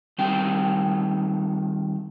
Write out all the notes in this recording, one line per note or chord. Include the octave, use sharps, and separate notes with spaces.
D#3 G3 C4 G5